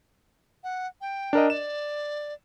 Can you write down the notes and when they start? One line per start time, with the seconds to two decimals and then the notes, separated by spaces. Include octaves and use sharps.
0.64 F#5
1.01 G5
1.33 D4 A#4 D#5
1.50 D5 E7